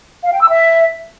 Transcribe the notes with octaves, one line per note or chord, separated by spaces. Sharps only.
F5
G5
E6
E5